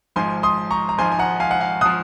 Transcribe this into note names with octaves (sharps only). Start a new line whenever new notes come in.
G#1 G#2 F3 G#5 C6
C6 D#6
A#5 C#6
A#5
G#1 G#2 F3 G#5 C6
G#5
F#5 A#5
F5 G#5
F#5
F5 G#5
F3 D#6 F#6